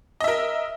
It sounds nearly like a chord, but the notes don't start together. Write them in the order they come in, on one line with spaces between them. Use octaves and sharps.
D#5 E5 A#4